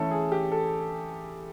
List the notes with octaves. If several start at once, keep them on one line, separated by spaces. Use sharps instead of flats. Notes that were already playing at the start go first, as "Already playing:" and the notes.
Already playing: E3 A3 C#4 E4 A4
G#4
G4
A4